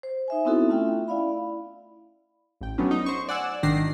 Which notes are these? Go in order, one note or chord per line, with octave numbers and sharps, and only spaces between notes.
C5
D#4 E5 G#5
B3 C4 D#4 E4 F#4 A4
A3 C#4 F4 E5 G5
E4 D5 F5 B5
A1 G5
F#3 A3 B3 C#4 D4
D#4
C5 C#6
D5 F#5 G#5 E6
G#1 D#3 D4 A#6 C7